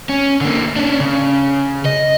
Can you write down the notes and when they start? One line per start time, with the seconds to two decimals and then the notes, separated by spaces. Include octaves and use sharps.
0.09 C#4
0.41 D3 A#3
0.76 C#4 D4
1.00 C#3
1.85 D#5